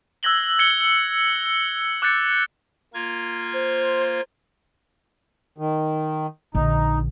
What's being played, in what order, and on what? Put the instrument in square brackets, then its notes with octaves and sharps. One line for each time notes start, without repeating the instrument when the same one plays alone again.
[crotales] E6 F#6 G#6 A#6 F#7 G7
G#6 C#7 F#7 G7
D6 F#6 G6 A6 C#7
[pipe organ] A#3 F4 G#6
[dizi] C5
[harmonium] D#3
[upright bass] A#1 D3 [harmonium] D#4